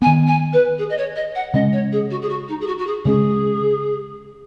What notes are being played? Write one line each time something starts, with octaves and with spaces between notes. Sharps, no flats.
D#3 B3 G#5
G#5
B4
G#4
D#5
C#5
D#5
F#5
C#3 G#3 C#4 D#5
C#5
G#4
F#4
G#4
F#4
D#4
G#4
F#4
F#4
G#4
C#3 G#3 C#4 G#4